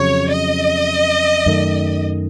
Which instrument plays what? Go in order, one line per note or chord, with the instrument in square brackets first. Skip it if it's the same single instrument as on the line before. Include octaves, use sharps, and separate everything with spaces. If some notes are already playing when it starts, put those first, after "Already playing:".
Already playing: [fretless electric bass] F2 C#3 F#3 [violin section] C#5
[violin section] D#5
[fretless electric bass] F#2 D#3 A3